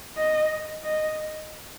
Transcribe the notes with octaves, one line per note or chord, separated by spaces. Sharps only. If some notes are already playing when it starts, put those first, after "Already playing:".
D#5
D#5